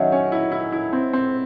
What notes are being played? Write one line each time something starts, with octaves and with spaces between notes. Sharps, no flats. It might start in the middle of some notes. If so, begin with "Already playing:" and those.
Already playing: D#3 F#3 C#4 C#5 D#5 E5 F#5
C#4
E4
E4
E4
C4
C4